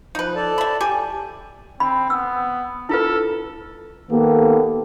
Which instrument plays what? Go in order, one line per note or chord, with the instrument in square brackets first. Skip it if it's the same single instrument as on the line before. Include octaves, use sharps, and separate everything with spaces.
[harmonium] F3 [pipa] D#4 B4
[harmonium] A4 D5 A5
[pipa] E5 B5
G4 G#5
[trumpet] C4 [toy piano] B5
[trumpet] B3 [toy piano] E6
[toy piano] E4 F4 B4 [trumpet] A4
[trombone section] D#3 A#3 B3 G4 A4